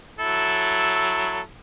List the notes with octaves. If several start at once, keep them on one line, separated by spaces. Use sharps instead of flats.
F#3 E4 A4